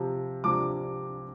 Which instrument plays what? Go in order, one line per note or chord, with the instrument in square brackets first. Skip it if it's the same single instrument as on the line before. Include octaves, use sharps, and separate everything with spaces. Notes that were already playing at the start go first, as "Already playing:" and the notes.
Already playing: [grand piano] C3 F3
C3 F3 D6